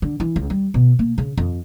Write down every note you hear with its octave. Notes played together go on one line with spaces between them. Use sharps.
D3
E3
C#2
G3
B2
A#3
C#3
F2